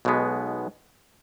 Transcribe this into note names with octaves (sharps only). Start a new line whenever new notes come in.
B1 B2 G#3 B3